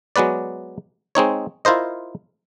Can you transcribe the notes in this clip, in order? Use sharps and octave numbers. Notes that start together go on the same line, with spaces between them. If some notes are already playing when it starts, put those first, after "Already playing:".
F#3 G#3 B3 B4 D5
G#3 C4 D#4 C#5
E4 F4 A#4 C5 D#5